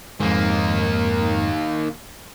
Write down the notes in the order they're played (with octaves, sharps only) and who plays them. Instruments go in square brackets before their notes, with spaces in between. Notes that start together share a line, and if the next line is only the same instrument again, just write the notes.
[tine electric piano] F2 G#2 [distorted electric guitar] D#3 A#3